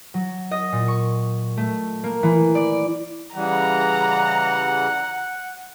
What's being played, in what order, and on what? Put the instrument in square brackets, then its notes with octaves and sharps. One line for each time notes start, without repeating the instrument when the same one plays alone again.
[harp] F#3
D#5
A#2
C#6
A3
A#3
E3
D5
[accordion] C#3 E3 G3 [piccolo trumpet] F#5 [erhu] A#5